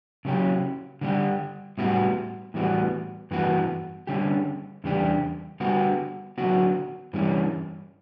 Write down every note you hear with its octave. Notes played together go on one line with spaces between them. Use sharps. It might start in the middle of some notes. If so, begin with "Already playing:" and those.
C#3 F#3 C#4 G4
D3 G3 D4 G4
A2 G3 B3 F#4
A2 E3 G3 B3 F#4
G2 E3 B3 F#4
D3 G3 C#4 G4
E2 C#3 G3 D4 G4
D3 G3 B3 F#4
D3 F#3 B3 F#4
G2 E3 G3 C#4